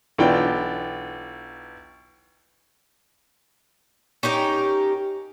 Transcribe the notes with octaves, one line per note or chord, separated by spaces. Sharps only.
B1 E3 D4 F4 G5
C#4 D#4 G4 A#4